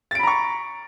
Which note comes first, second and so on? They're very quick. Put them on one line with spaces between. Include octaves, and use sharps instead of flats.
A6 D7 B5 A#5 C#6